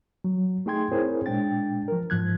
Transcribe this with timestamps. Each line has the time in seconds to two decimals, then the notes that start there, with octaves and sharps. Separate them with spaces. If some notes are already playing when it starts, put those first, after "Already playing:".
0.24 F#3
0.66 A3 D#4 G#4 G5 C6 G#6
0.92 C4 E4 G#4 A#4 C5 C#5
1.26 A#2 G#3 D4 G5 A6
1.88 F3 A#4
2.10 G#2 F3 F#6 G#6